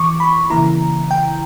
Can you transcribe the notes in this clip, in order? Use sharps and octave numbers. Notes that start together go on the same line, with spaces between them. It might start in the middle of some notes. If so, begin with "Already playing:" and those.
Already playing: E3 C#6 D6
B5
C#3 E3 A#3 E4 A#5
G5